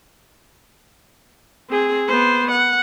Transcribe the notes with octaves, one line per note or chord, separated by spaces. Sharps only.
C4 G#4
B3 C5
F#5